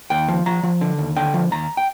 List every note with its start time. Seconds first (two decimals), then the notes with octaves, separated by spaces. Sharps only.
0.10 D#2 G5
0.28 F3
0.46 F3 A#5
0.63 F3
0.81 D3
0.98 D#2
1.16 D3 G5
1.34 F3
1.51 D#2 A#5
1.77 G5